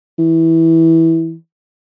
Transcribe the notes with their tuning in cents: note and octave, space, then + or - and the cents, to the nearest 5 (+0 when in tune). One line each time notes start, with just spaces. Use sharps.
E3 -15